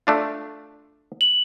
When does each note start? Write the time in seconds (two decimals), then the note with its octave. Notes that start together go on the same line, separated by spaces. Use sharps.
0.07 A3 D4 F4
1.21 F#7